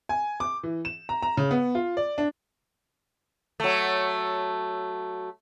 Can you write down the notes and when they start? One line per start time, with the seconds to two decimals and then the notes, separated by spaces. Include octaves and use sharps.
0.09 G#5
0.40 D6
0.63 E3
0.85 E7
1.09 A#5
1.22 A#5
1.37 C#3
1.51 B3
1.75 F4
1.97 D5
2.18 D4
3.60 F#3 A3